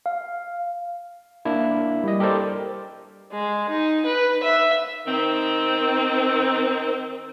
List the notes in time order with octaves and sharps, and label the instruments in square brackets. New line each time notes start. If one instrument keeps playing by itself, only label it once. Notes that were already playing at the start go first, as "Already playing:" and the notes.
[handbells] F5
[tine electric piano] A#3 D4 E4
G3 D#5
G4 A4 A#4 C5 D5
[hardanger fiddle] G#3
D#4
B4
E5
[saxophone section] D#3 C4